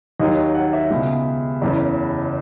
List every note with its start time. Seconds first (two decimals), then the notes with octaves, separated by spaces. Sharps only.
0.20 D#2 D#3 F#3 D#5
0.54 F#5
0.73 E5
0.91 C#2 B2 G#3
1.62 F#1 E2 C#3